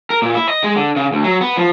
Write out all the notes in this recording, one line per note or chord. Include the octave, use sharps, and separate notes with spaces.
A#4
A#2
E4
D#5
G#3
D3
C#3
D2
F#3
B3
F3